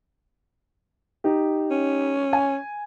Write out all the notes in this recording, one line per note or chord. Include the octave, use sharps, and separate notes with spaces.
D#4 G4
C#4
G#5